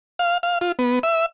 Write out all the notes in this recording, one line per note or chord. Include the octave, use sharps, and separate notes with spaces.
F5
F5
F4
B3
E5